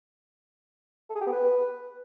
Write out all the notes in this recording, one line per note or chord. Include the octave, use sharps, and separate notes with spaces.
A4
G#4
G4
B3
B4